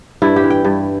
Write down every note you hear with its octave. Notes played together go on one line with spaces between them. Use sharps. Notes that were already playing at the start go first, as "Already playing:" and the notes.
G2 E4
G4
E3
G5
G2